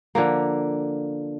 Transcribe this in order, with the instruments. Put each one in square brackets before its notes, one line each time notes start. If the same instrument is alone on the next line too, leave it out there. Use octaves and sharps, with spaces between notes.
[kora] D3 F3 A#3